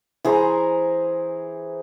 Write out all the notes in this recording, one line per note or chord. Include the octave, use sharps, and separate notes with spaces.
E3 G#4 C5 A#5